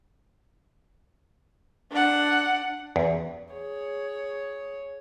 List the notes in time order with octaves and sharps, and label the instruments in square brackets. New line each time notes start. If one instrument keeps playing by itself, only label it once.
[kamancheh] D4 F#5
[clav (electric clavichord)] E2
[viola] G#4 C#5